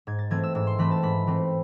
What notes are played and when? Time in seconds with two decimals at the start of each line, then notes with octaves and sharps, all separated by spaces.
0.07 G#2 G#6
0.19 A6
0.30 E3 A3 C4 G#6
0.43 E6
0.55 G#2 E6
0.67 C6
0.79 E3 A3 C4 B5
0.91 A5
1.03 G#2 B5
1.27 E3 A3 C4